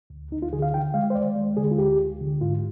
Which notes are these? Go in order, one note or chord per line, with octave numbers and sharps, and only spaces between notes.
D2
D2 D#4
F4
D3 G#4
F5
D#3 G5
G#3 F5
C5
D#2 D5
G#3
D3 G#4
F4
D2 G4
D2
D3
G#2 F4